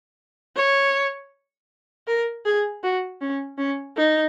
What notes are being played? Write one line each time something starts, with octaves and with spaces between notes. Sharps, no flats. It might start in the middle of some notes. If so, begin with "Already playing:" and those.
C#5
A#4
G#4
F#4
C#4
C#4
D#4